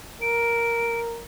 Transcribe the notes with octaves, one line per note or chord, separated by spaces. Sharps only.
A#4 D7